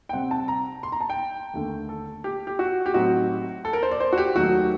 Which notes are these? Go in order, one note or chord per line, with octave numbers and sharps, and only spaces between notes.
G5
C3 G3 C4 F#5
A5
A#5
C6
A#5
A5
G5
D#2 D3 A3
A4
G4
G4
F#4
G4
A2 F#3 C4 D#4 F#4
A4
A#4
C5
D5
C5
F#4
G4
D#2 D#3 F#3 A3 D#4 F#4